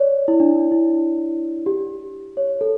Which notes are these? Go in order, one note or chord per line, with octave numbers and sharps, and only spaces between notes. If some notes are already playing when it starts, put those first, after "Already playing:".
Already playing: C#5 D5
E4
D4
E4
G4
C#5
A4